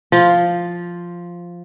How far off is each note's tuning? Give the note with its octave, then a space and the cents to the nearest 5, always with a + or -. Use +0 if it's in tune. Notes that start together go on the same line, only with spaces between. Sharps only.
F3 +0 F4 +0